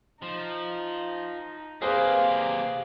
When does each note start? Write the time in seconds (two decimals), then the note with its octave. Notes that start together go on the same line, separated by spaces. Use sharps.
0.22 F3 D#4
1.82 C3 A#3 G#4 B4 C5 D5 F5